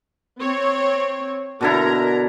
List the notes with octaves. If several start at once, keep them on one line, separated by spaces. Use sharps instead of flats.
C4 C#5
B2 D3 E4 A#4 A#5